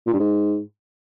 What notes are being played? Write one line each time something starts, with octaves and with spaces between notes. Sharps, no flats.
A#2
G2
G#2